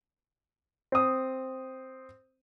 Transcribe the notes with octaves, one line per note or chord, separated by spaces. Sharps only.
C4 D#6